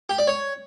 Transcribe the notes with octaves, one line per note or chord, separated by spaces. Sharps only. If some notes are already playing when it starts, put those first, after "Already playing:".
G4
D5
C#5